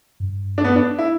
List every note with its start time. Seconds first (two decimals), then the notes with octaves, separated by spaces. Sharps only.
0.20 G2
0.58 D4
0.64 B3
0.76 D4
0.98 E4